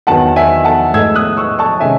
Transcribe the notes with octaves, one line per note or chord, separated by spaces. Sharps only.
E2 D#3 F#3 F#5 A5
E5 G#5
F#5 A5
A2 G#3 D#4 E6 G#6
D#6 F#6
C#6 E6
A5 C#6
C3 D#3 G#3 C#4 E5 G#5